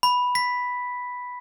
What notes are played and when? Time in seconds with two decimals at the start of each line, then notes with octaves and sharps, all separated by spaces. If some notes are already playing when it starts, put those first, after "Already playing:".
0.03 B5
0.35 B6